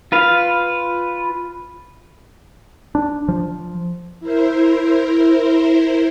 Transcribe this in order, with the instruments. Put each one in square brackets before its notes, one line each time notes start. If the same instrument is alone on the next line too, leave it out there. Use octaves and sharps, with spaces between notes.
[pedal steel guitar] F4 B4 F5
[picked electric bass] D4
F3
[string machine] E4 A#4 C5